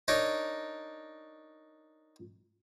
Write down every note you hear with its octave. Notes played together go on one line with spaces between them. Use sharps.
D4 D#4 A#4 C#5